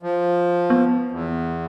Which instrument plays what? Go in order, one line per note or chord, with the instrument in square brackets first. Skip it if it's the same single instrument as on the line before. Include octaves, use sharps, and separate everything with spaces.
[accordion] F3
[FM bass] B3
[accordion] E2